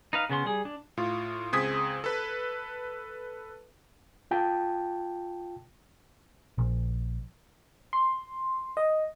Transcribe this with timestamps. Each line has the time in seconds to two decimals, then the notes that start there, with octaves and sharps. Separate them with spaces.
0.13 D#4 B4 F5
0.30 C#3 B3 C#4 C6
0.45 G3 G#4
0.65 D4
0.97 A2 F4
1.53 C#2 C4 G#4 D#6 G#6 B6
2.04 A4 B4
4.31 F4 G5 A5
6.58 A#1
7.93 C6
8.77 D#5